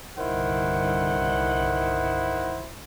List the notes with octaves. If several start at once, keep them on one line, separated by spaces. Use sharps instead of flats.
C2 G2 D3 D#3 E4 C5 F#5